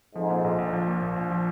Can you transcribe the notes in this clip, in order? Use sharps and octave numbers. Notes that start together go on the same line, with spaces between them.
F2 G#2 F3
A#2
A#1
A#1
F3
A#2
A#1
A#1
F3